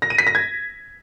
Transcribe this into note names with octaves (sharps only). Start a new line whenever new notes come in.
A#6
D#7
B6
A#6
G#6